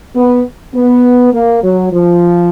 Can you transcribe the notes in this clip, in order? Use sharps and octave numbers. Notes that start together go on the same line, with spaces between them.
B3
B3
A#3
F#3
F3